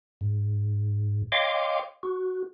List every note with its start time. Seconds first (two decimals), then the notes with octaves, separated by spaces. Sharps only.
0.21 G#2
1.32 C#5 D#5 F5 G5 C6 D6
2.03 F#4